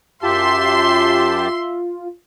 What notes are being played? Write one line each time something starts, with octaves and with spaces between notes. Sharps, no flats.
F#2 F4 G4 E5 A5 C6